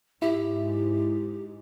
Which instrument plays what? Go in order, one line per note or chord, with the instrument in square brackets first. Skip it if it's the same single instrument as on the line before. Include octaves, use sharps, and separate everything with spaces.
[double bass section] G#2 [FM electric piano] E4 [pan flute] G4